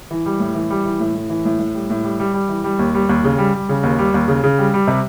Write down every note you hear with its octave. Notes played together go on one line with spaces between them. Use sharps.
E3
G3
A2
E3
G3
E3
A2
A2
E3
A2
A2
G3
A2
G3
G3
G3
E3
G3
D#2
G3
D#2
C#3
G3
G3
C#3
D#2
G3
D#2
C#3
C#3
G3
G3
C3